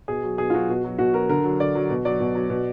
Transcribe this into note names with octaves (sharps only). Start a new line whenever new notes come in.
B2 G#4
F#3
B2 G#4
F4
F#3 F#4
B2
F#3
B2 F#4
F#3 A#4
D3 A#4
F#3
D3 D5
F#3
B2
F#3 D5
B2
F#3
B2